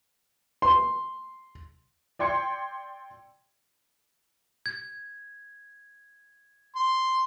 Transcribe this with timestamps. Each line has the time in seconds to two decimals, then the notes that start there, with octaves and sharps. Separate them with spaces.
0.62 C6
2.19 D5 G5 C6 G#6 C#7
4.66 G#6
6.76 C6